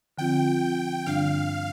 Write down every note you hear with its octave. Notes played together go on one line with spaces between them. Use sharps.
D3 F3 C4 F4 G5
G2 D3 G3 D4 F5